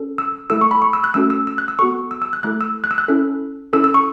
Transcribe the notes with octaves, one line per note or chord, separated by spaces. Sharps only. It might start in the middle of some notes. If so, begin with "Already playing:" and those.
Already playing: C#4 A4
E6
A3 E4 A4 E6
C#6
B5
C#6
E6
F#6
A3 C#4 F#4 A4 E6
E6
E6
F#6
E6
B3 F#4 A4 C#6
E6
E6
F#6
A3 E4 A4 F#6
E6
F#6
E6
F#6
C#4 E4 A4
C#4 E4 A4 E6
E6
C#6